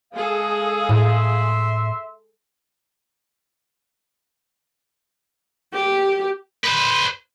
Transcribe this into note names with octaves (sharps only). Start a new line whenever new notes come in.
G#3 G#4 A4 F5
A2 E5 C6
G4
B4 C5